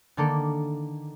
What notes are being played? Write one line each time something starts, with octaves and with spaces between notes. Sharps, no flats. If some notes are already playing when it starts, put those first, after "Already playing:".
D3 D#3 A#3 A4 D5